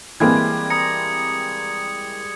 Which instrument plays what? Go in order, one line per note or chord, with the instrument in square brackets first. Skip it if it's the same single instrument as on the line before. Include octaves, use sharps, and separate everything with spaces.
[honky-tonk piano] E3 A#3 C4 [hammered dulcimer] G3 G#3 [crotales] G#6
[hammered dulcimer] A#5 [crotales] D#6 C#7